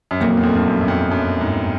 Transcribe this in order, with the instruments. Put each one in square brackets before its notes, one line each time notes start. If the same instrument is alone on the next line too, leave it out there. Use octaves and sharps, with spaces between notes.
[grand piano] F#2
[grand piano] F2 [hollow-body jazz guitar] A#2 F#3 A#3
[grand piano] E2
F2
G2
F#2
F#2
F2
F#2
G#2